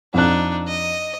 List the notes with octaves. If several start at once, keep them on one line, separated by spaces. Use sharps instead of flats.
F2 D4 D#4 F#6
D#5